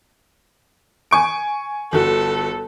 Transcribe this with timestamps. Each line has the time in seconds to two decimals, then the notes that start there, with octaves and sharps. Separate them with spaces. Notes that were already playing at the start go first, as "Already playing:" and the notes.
1.11 G#5 C#6 D7
1.93 G1 F#4 A4